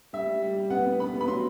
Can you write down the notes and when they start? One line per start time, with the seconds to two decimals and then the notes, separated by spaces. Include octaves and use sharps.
0.13 G3 E5
0.27 G3
0.42 G3
0.57 G3
0.70 B3 F#5
0.85 B3
1.00 B3 B5
1.14 B3
1.21 B5
1.28 F#3 C6